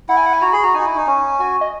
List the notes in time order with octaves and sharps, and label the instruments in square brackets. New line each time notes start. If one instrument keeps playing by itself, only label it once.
[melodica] E4 [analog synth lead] F#5
[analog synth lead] G#5
F#5
G#5
[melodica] F#4 [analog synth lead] A#5
[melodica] G#4 [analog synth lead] B5
[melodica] F#4 [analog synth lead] A#5
[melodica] D#4 [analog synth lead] G#5
[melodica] F#4
E4
D#4
C#4
[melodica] F#4 [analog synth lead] G#5
[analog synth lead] D#5